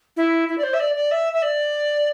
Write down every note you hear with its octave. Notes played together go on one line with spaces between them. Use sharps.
E4
E4
D5
C5
E5
D5
D5
E5
E5
D5